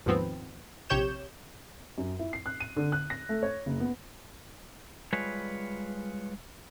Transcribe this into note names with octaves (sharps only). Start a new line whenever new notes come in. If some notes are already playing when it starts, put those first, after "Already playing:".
D#2 G#2 F3 B3 C4
A#1 C3 G4 C#5 G6 E7
F#2
E4
C7
F#6
D#7
D3
F#6
A#6
A3
C#5
F#1
B3
G3 G#3 F4 B4 C#5